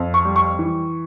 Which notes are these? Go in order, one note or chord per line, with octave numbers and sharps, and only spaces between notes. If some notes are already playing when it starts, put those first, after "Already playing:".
Already playing: F2
C#6
G3
C#6
E3